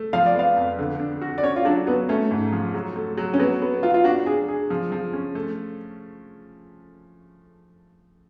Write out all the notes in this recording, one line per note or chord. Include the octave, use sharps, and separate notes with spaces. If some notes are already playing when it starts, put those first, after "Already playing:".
Already playing: A3
F3 F5
D5
B3 F5
F2
D3
D4
F#4
D5
C#4 C#5
F4
F#3 D4
F#3 B3
A3 C#4
G#2
F3
F#3
A3
F#3
C#4
F#3 B3
B3
F#3 F4
F4
D4 F#4
D4 G#4
G#4
F3
F3
C#4
A3